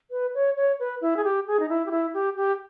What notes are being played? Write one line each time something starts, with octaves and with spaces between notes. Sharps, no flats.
B4
C#5
C#5
B4
E4
G#4
G4
G#4
D#4
E4
G4
E4
G4
G4